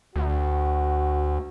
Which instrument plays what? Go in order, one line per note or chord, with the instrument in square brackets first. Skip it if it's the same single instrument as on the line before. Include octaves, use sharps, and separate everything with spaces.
[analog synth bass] D2 [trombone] F#4